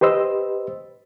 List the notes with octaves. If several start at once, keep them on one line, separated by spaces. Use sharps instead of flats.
G4 B4 C5 D#5 E6